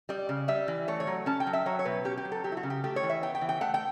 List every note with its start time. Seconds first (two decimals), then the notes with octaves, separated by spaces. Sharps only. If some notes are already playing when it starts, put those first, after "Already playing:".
0.09 G3 D5
0.29 C#3
0.48 G3 E5
0.68 E3
0.88 A3 C#5
1.00 C#5
1.07 F#3
1.26 C#4 A5
1.40 G5
1.47 F#3
1.53 E5
1.66 F#3 C#5
1.79 C#5
1.85 B2 B4
2.04 C#4 G4
2.17 G4
2.25 F#3
2.32 A4
2.44 F#3 G4
2.52 E4
2.57 F#4
2.63 C#3
2.70 G4
2.84 A3 G4
2.96 C#5
3.03 E3
3.10 E5
3.23 B3 G5
3.35 G5
3.41 E3
3.49 G5
3.61 A3 F#5
3.74 G5